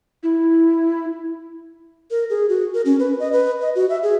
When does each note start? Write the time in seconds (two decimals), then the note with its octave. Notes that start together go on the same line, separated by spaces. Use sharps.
0.23 E4
2.11 A#4
2.30 G#4
2.49 F#4
2.74 A#4
2.85 C#4
3.00 B4
3.20 D#5
3.32 B4
3.61 D#5
3.75 F#4
3.89 E5
4.03 G#4